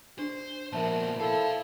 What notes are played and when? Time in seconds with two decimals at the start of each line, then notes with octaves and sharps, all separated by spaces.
0.19 D4 C5
0.73 A#2 F3 B3 A#4 C5 E5 A5
1.20 E4 A4 C5 F5